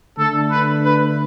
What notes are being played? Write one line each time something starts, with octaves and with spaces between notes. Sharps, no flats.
D3 A3 D4 A4
B4
B4